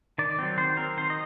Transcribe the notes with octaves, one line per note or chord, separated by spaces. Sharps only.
D#3 D5
F#3 C4
D#3 C5
F#3 C4 A#4
D#3 C5
D#5